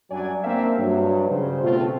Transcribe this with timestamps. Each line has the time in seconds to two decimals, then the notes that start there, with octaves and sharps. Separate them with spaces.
0.11 F#2 F#3 G3 D4 D5 G#5
0.44 A#3 C4 D4 A#4 E5 F5
0.78 G2 F#3
1.29 C#3 C5
1.63 B2 A3 C4 F4